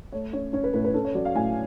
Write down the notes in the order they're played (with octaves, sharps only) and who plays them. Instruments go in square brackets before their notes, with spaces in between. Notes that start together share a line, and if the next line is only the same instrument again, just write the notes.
[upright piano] A3 C#5
C#4 C#5
C#4 C#5
B4
A2 B4
B4
C#4 A4
C#5
F#3 D5
F5
A2 G#5